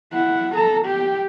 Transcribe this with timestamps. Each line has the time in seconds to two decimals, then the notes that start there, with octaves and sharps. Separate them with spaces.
0.12 E4 F#5
0.55 A4 A#5
0.85 G4 G5